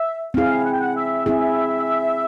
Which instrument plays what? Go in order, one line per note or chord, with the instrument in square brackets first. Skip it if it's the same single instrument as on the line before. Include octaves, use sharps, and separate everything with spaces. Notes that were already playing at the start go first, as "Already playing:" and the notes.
Already playing: [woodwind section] E5
[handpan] C4 E4 G#4 [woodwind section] F5
[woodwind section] F#5
G5
F#5
E5
[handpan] C4 E4 G#4 [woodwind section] E5